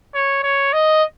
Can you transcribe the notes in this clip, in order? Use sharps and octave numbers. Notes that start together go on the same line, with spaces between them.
C#5
C#5
D#5